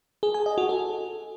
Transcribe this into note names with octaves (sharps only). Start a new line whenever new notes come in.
G#4
G#5
D#5
F#4
A4